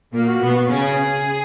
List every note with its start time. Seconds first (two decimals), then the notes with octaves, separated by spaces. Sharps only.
0.13 A#2 A#3
0.27 F#4
0.41 B2 B3
0.69 C#3 C#4 G#4